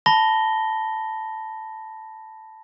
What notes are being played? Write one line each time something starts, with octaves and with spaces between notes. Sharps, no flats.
A5 B5 A#6 G7